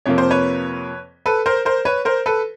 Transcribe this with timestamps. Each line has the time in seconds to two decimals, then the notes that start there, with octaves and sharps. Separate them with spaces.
0.06 F2 C3 F3 A#3 C#5
0.18 C5
0.31 B4 C#5
1.26 A4 B4
1.46 A#4 C5
1.65 A#4 C5
1.85 B4 C#5
2.05 A#4 C5
2.26 A4 B4